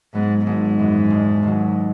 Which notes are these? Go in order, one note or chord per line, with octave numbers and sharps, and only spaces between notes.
G#2 F#3 B3
G#1 G#2
F#2 E3 G#3
E1
D#2 D#3 F#3